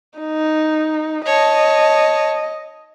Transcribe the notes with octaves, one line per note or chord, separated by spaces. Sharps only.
D#4
C#5 D#5 A5